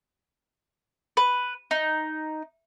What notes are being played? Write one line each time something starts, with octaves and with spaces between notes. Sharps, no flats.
B4
D#4